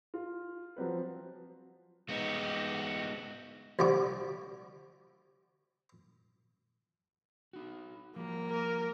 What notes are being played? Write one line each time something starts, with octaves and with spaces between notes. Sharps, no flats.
F4
F3 F#3 C4 B4
G#3 B3 D#4 F#4 G4
D2 C3 G3 F#4 D6
D#4 F#4
F3 G3 A#3
A#4